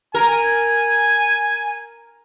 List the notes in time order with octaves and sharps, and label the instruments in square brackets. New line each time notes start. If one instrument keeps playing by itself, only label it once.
[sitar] A#4 [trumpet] G#5